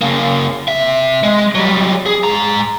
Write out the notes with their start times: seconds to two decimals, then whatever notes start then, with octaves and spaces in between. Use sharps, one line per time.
0.01 C#3 A#3
0.68 C3 E5
1.23 G#3
1.55 F#3 G3
2.06 G#4
2.24 G#2 A#5